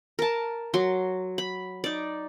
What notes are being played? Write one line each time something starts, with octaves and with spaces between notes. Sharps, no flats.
A#4 A5
F#3 C6
B5
D#4 D5